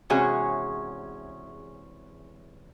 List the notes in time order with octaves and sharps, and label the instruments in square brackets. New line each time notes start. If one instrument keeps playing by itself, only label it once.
[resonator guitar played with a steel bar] E2 C3 G#3 C#4 F#4 G#4